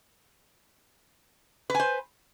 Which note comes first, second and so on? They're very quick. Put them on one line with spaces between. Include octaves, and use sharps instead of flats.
B4 G#5 C5